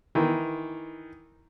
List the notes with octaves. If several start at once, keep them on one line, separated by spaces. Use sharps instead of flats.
D#3 E3